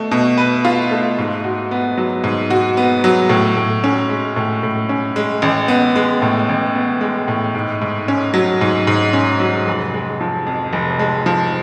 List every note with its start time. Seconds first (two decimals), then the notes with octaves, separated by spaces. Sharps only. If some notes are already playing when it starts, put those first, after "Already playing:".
Already playing: B2 A3
0.11 B2
0.37 B4
0.65 F4
0.91 A3
1.18 G#2
1.44 F#4
1.71 B3
1.97 F#3
2.24 G#2
2.50 F#4
2.77 B3
3.04 F#3
3.29 A2
3.56 A2
3.84 C#4
4.09 G#3
4.36 A2
4.63 A2
4.89 C#4
5.16 G#3
5.42 A1
5.68 B3
5.96 G#3
6.22 A2
6.49 A1
6.75 B3
7.01 G#3
7.28 A2
7.55 G#2
7.81 G#2
8.08 C#4
8.34 F#3
8.61 G#2
8.87 G#2
9.13 C#4
9.40 F#3
9.67 F1
9.93 G#3
10.21 F3
10.47 F2
10.73 F1
10.99 G#3
11.26 F3